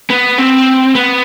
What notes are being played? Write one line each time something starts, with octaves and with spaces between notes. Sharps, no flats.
B3
C4
B3